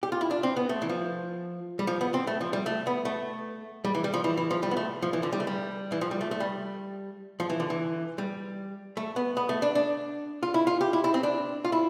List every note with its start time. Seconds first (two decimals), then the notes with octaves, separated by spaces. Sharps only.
0.03 G4
0.12 F4
0.21 E4
0.31 D4
0.43 C4
0.56 B3
0.69 A3
0.82 E3
0.89 F3
1.79 G3
1.87 F3
2.01 B3
2.14 C4
2.27 A3
2.41 F3
2.53 G3
2.66 A3
2.87 B3
3.05 A3
3.84 G3
3.95 E3
4.04 G3
4.13 F3
4.24 E3
4.37 E3
4.50 F3
4.63 G3
4.71 B3
4.77 A3
5.02 F3
5.13 E3
5.23 D3
5.32 G3
5.40 A3
5.47 G3
5.92 E3
6.01 F3
6.11 G3
6.21 A3
6.31 A3
6.40 G3
7.40 F3
7.50 E3
7.60 D3
7.70 E3
8.18 G3
8.97 A3
9.16 B3
9.37 B3
9.49 A3
9.62 D4
9.75 D4
10.43 F4
10.54 E4
10.67 F4
10.81 G4
10.93 E4
11.04 E4
11.14 C4
11.23 D4
11.64 F4
11.72 E4